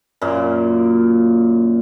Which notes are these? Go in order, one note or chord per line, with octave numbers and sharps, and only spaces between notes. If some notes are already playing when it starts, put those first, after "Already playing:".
F#2 A#2 A#3